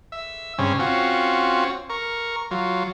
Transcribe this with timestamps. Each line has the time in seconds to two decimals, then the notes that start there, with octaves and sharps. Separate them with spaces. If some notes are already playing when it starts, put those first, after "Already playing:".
0.12 E5
0.58 G2 C#3 C4 C#4
0.79 C4 C#4 F4 F#4
1.90 A#4 C#6
2.51 F#3 F4